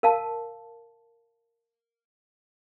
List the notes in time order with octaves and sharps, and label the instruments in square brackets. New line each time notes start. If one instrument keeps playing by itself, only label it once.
[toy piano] A#4 F5 A5